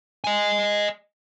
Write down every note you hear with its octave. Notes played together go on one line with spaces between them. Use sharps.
D#5 G#5